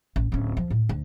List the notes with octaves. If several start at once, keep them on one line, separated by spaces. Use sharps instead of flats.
A1
D1 C#4
F3
A2
D2